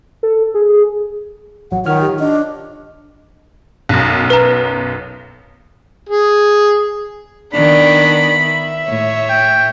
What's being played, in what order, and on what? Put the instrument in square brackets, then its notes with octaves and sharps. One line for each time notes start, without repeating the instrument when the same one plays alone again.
[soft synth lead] A4
G#4
[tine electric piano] A1 F#3 [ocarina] F#5
[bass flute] D#3 [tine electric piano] F4 C#5 F6 [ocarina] F#5
[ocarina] G4
[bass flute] D4 [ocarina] D#5
[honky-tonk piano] B1 F#2
[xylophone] B4 A#5
[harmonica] G#4
[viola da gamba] D#3 B3 [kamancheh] D4 [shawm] B5
[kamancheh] E5
[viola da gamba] A2 C#5
[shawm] G5